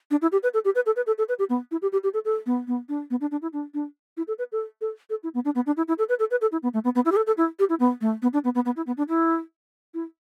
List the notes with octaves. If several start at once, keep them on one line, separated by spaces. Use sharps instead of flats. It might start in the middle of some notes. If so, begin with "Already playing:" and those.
D4
E4
G4
B4
A4
G4
B4
A4
B4
A4
A4
B4
G4
B3
E4
G4
G4
G4
A4
A4
B3
B3
D4
B3
D4
D4
E4
D4
D4
E4
A4
B4
A4
A4
A4
E4
B3
D4
B3
D4
E4
E4
A4
B4
A4
B4
A4
E4
B3
A3
B3
B3
E4
G4
A4
A4
E4
G4
E4
B3
A3
B3
D4
B3
B3
B3
E4
B3
D4
E4
E4